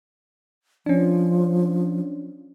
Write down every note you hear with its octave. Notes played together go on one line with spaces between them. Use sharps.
F3 C#4 D4